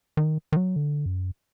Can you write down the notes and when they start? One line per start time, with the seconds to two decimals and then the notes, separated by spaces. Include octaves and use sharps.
0.17 D#3
0.52 D#3
0.56 F#3
0.76 D3
1.06 F#2